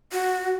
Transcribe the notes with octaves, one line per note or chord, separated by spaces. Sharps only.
F#4